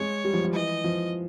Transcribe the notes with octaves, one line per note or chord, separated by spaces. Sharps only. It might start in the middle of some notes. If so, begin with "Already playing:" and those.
Already playing: G#3 C#5
G3
F3
F3
E3 D#5
F3